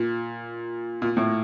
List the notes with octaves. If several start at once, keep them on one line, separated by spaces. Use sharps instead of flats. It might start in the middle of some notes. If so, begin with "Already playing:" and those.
Already playing: A#2
A#2
A2